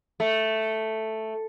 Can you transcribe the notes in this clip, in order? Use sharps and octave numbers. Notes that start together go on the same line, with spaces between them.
A3